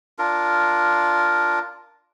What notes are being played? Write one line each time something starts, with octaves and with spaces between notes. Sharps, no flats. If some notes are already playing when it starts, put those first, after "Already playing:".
D4 F4 A#4